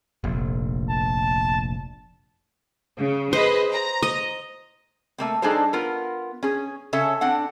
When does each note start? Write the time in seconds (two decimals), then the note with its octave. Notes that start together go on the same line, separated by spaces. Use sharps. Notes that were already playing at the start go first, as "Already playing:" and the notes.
0.24 F1 A#1
0.89 A5
2.97 C#3
3.33 G#4 B4 C5 D#5
3.72 A#5
4.03 D#5
5.18 A3 A#3 C4
5.42 G3 D4 D#4 G#4 A4 C5
5.73 B3 F4 A#4
6.43 C#4 G#4
6.93 C#3 C#4 A4 E5
7.21 C4 D4 F#5